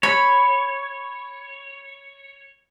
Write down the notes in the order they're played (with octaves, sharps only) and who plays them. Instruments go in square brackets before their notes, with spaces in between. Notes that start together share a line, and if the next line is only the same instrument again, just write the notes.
[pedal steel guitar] C#5 [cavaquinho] B5